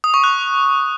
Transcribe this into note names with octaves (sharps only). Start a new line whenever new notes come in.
D#6
C#6
F#6